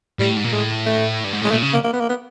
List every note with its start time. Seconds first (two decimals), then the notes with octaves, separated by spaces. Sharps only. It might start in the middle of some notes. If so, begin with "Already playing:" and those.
0.19 A2 G3
0.37 G#2
0.44 A#2
0.52 A2 G#3
0.86 A3
1.24 G2
1.33 G#2
1.42 A2 G#3
1.51 A#2 A3
1.62 C#3
1.74 A#3
1.84 A#3
1.93 B3
2.00 A#3
2.09 B3